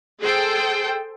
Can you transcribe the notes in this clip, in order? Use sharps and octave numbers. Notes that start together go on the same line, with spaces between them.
G#4 A4 C5 G5